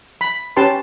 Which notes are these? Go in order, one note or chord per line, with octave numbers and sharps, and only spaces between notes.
B5
C#4 G4 B4 A5 C6